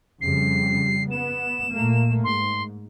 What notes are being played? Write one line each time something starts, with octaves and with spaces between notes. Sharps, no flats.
F2 C#3 G3 C7
B3 E7
A#2 A3 A#3
G#2 C6